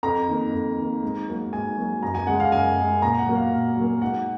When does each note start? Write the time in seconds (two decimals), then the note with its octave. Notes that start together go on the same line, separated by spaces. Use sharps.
0.03 F2 A#5
0.28 D#3 A#3
0.53 F2
0.78 D#3 A#3
1.03 G#2
1.28 F#3 A#3
1.52 G#2 G#5
1.77 F#3 A#3
2.03 F#2 A#5
2.15 G#5
2.27 C#3 G#3 F#5
2.40 F5
2.52 F#2 G#5
2.77 C#3 G#3
3.02 A#2 A#5
3.19 F#5
3.27 F#3 A#3
3.35 F5
3.52 A#2
3.77 F#3 A#3
4.02 G#2 F#5